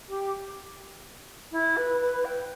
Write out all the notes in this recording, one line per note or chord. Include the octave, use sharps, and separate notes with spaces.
G4
E4
B4
B4
G5